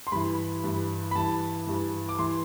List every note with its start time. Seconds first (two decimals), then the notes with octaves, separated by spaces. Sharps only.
0.07 C6
0.12 G2 E3 B5
0.64 G2 E3
1.11 B5
1.15 G2 E3 A5
1.67 G2 E3
2.09 D6
2.19 E3 C6